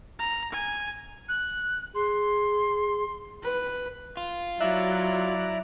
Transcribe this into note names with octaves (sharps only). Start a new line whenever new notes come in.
A#5
G#5
F#6
G#4 C6
B4
F4
F#3 E4 D5 E5 A#5 F#6